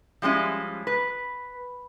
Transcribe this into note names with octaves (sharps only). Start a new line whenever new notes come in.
F3 G3 G#3 C#4 E4
B4